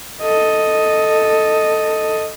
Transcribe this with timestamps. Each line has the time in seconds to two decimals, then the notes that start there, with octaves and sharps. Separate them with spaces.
0.22 A4 D#5